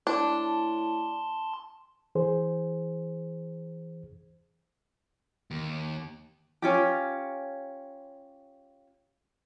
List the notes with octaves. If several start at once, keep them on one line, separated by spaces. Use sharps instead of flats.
A2 D4 A5 C6
E3 G#4 C5
D#2
C#4 F4 G4